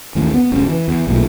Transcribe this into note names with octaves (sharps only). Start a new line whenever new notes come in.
A1 D#2 A2
B3
F1 C#2 C#3
E3
E2
B1 A#2 A3